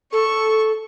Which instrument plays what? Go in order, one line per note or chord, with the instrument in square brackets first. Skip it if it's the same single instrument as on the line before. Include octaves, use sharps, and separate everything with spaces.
[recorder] A4 [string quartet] C#6